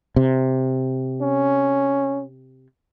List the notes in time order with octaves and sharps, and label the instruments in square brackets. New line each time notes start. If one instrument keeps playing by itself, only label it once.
[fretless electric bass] C3
[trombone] C#4